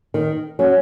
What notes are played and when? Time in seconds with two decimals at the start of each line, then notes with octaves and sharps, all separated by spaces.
0.14 D#3
0.59 F#3 C#4